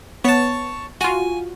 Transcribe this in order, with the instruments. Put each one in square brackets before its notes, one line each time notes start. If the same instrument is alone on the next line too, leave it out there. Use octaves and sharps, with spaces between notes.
[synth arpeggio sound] B3 [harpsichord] C#5 A5
[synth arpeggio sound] F4 F#4 [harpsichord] G#5